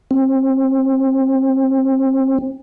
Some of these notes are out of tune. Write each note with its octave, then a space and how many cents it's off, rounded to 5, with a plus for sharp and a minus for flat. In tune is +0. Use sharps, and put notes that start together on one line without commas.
C4 +30